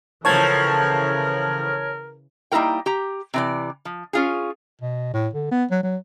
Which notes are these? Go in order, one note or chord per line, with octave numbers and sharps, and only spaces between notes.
A2 C#3 E3 F3 A#4 C#5 A5 G#6
G3 A#3 D#4 E4 A#4 G5
G4 A#5
C3 E3 D5
F3
C#4 F4 G#4
B2
A2
D3
B3
F#3
F#3